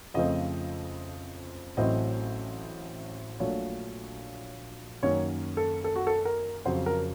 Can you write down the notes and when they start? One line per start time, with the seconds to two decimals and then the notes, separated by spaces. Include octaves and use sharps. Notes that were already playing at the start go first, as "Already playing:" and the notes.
0.14 F2 C#3 F3 A3 C4 D#5
1.77 A1 A2 F#3 C4 D#5
3.40 A#1 A#2 F#3 A3 C#5
5.03 F#2 D#3 A#3 C#4 C#5
5.57 A4
5.84 A4
5.96 F#4
6.07 A4
6.25 A#4
6.66 F2 C#3 F#3 C5
6.86 A#4